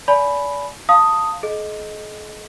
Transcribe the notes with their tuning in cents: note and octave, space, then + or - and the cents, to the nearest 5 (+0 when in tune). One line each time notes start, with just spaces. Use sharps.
D5 -35 G#5 +35 B5 +0
F5 +0 A5 +20 D#6 +0
G#4 +45 D#5 +0